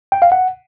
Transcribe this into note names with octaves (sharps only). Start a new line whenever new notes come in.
G5
F5
F#5